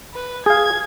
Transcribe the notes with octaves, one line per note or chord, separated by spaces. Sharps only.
B4
G#4 F5 G#6